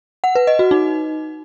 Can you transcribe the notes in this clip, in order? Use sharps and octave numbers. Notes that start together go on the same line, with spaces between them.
F#5
B4
D#5
F#4
D#4